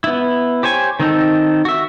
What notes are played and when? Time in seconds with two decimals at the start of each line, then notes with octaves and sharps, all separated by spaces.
0.04 B3 E4
0.63 G4 C5 C#5 G#5
1.00 D#3 C4 D#4 A4
1.65 F#4 E5